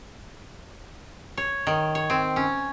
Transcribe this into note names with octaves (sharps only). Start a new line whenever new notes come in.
C#5
D#3
C#5
C4
C#4